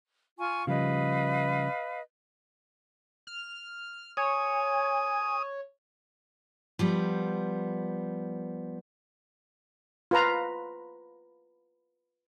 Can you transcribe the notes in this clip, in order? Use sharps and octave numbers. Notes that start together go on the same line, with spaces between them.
F4 G#5 C#6
C#3 F3 G3 B4 D#5 F5
F6
C#5 G#5 D#6
F3 G3 B3
F4 B4 A#5